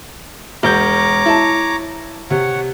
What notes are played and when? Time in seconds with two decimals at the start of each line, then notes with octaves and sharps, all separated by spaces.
0.63 E1 C#5 A#5 D6 G6
1.26 E4 A5
2.30 C3 C#5 F#5